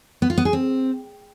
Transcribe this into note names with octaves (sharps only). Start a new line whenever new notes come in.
B3
F4
B3
G#4
C4